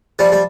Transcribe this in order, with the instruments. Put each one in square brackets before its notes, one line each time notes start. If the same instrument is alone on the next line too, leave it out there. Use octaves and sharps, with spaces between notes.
[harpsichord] F3 G3
G3